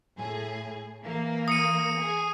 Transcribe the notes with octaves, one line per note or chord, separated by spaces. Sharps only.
A2 G#4
E3 A#3
D#6 C#7 D#7
G#4